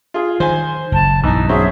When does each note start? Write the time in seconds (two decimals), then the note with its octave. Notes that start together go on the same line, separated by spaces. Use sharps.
0.14 F4 G#4
0.40 D#3 C5 G#5
0.92 F#1 A5
1.23 B1 G2 E3 D#4
1.49 F#3 C4 C#4 G#4 E5